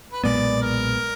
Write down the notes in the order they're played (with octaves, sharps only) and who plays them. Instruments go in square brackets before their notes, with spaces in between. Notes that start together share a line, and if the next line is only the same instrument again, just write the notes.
[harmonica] B4
[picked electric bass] B1 A#2 G#3 B3 [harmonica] D5
[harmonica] A#4